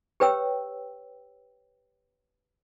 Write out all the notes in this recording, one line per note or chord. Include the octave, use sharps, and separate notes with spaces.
G4 B4 C#5 G5 E6